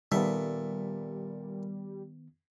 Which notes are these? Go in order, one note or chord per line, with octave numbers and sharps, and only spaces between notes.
A#2 D#3 G3 B3 A4 E5